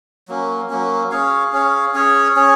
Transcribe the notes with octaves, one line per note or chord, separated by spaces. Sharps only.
F#3 A#3 C#4
F#3 A#3 C#4
C#4 G#4 C#5 F5
C#4 G#4 C#5 F5
C#4 G#4 C#5
C#4 G#4 C#5